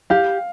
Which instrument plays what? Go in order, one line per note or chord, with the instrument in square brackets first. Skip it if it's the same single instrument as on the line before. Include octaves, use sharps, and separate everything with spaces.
[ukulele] G4 [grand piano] F5